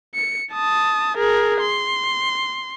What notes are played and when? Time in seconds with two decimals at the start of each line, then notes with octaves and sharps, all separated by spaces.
0.14 C#7
0.53 A5 D#6
1.17 G#4 A#4
1.61 C6